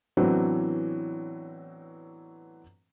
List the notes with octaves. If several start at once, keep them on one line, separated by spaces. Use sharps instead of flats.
A2 E3 F#3 B3 C4 D4